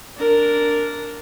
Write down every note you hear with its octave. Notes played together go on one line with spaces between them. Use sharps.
D4 A#4